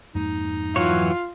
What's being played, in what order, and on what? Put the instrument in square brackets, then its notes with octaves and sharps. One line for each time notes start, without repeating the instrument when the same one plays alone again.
[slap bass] F2 G#2 A#3 [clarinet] D#4
[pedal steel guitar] E3 F#3 C#5 [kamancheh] F4